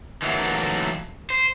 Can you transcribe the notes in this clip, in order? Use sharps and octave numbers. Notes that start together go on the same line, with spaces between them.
D#3 E3 F#3 A3 A#3
C5